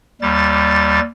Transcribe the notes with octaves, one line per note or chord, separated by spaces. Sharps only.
D#2 G3 A6